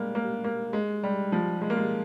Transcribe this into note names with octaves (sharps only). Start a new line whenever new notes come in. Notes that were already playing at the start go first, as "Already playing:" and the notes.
Already playing: G3 G#3 A#3
A#3
A#3
G#3
G3
F3
G#3
A#3
G#3